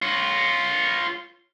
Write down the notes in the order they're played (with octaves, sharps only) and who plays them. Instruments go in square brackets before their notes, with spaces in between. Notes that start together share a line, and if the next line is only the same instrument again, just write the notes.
[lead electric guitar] F4 C#5